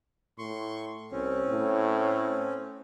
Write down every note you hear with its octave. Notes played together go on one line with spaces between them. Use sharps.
A2 C6 C#6
C2 C4 C#4
A2